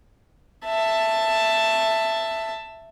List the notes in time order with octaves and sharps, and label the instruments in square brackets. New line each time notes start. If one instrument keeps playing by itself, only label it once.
[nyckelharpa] E5 A5